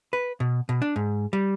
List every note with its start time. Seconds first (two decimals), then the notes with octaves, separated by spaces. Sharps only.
0.13 B4
0.40 B2
0.69 B2
0.82 D4
0.96 G#2
1.33 G3